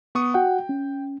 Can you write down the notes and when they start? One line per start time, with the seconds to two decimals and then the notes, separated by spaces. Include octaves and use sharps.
0.15 B3 C#6 D#6
0.34 F#4 F#5 G5
0.69 C#4